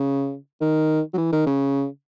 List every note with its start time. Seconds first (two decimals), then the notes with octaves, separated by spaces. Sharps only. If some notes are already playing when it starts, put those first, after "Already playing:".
Already playing: C#3
0.61 D#3
1.14 F#3
1.18 E3
1.33 D#3
1.46 C#3